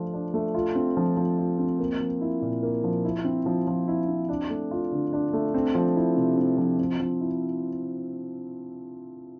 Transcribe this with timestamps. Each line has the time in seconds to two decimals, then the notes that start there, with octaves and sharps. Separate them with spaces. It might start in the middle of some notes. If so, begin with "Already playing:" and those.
Already playing: F3 A3 D4 F4
0.13 D4
0.34 A3
0.54 F4
0.75 C4
0.97 F3
1.17 F3
1.38 F4
1.59 C4
1.79 A#3
2.00 F3
2.21 E4
2.42 A#2
2.63 A#3
2.84 F3
3.05 E4
3.25 C4
3.46 F3
3.67 F3
3.88 E4
4.08 C4
4.29 D4
4.50 A3
4.71 F4
4.92 D3
5.13 D4
5.33 A3
5.54 C4
5.75 F3
5.96 E4
6.17 C3
6.37 C4
6.58 F3
6.79 C4
7.00 F3
7.21 E4